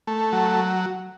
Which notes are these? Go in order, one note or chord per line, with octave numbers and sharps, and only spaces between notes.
A3
F#3